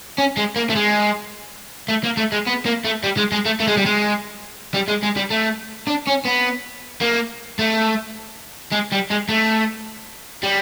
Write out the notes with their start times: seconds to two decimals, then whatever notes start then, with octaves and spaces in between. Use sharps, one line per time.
0.18 C#4
0.37 G#3
0.56 A#3
0.70 A3
0.75 G#3
1.88 A3
2.04 A#3
2.17 A3
2.32 G#3
2.47 B3
2.65 A#3
2.84 A3
3.03 G3
3.17 G#3
3.32 G#3
3.46 A3
3.60 A3
3.68 G#3
3.77 G3
3.86 G#3
4.74 G3
4.88 G#3
5.03 G#3
5.16 G3
5.30 A3
5.87 D4
6.07 C#4
6.25 B3
7.01 A#3
7.59 A3
8.72 G#3
8.92 G3
9.10 G#3
9.29 A3
10.43 G3